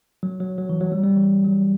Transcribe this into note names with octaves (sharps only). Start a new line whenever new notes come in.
F#3
F#3
F#3
E3
F#3
G3
G3
E3
F#3